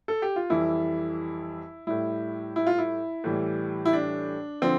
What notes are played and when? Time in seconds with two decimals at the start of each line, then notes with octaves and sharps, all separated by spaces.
0.08 A4
0.22 G4
0.36 F4
0.50 F2 E3 G3 E4
1.87 A2 G3 E4
2.56 E4
2.67 F4
2.78 E4
3.24 A2 E3 G3
3.85 E4
3.93 D4
4.62 D3 F3 C4